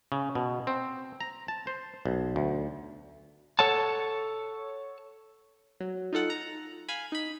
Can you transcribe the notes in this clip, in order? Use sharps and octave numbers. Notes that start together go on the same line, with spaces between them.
C#3
B2
C4
A#5
A5
C5
B1
D2
A4 C#5 F#5 A5
F#3
D#4 F4 A4 F#5
A#5
F5 G#5 B5
D#4 B5